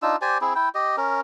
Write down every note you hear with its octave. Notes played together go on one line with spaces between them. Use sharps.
D4 D#4 F4 E6
G4 C5 D5 G#5
C4 E4 G#4
E4 G5
G4 D#5
C#4 A#4